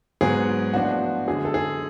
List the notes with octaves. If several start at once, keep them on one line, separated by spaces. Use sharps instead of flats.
G#2 F#3 B3 G#4
A2 F3 B3 D4 F#4
F#2 D3 G#3 G#4
A4
G#4